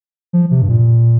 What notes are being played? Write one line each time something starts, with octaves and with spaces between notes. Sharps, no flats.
F3
C3
G2
A#2